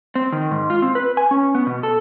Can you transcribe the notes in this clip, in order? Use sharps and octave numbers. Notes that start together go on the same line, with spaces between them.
C4
D#3
G#2
F4
C4
B4
G#5
C#4
B3
B2
A4